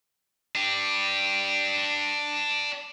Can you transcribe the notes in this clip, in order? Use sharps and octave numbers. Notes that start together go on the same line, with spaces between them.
D4 G4